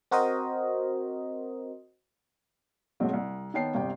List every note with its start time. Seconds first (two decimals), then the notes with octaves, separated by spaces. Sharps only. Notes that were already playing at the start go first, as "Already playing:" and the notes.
0.11 C4 F#4 A#4 C5 D#5
3.00 F#1 B1 G#2 F#3 C4
3.13 C2
3.54 D#3 B3 C#5 G5 A5 C7
3.74 G1 C2 C3 G5